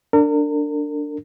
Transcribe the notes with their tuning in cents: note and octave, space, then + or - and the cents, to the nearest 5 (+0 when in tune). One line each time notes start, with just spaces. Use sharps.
D4 +0 A#4 -40